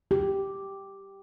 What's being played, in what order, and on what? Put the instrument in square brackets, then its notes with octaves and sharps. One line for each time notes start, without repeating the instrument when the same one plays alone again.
[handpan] G4